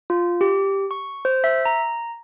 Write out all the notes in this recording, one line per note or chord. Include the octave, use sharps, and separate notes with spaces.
F4
G4
C#6
C5
E5
A#5